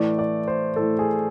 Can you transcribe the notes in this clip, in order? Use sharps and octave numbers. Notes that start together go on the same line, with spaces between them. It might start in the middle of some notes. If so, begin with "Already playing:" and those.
Already playing: A2 E3 A3 D5
D5
C5
A2 E3 A3 A4
G#4